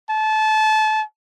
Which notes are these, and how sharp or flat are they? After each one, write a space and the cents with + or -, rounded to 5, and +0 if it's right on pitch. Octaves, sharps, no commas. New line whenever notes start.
A5 -25